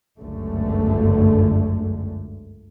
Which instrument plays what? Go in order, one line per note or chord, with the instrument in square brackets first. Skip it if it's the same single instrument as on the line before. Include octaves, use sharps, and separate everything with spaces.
[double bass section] G1 C#2 F#2 D3 A3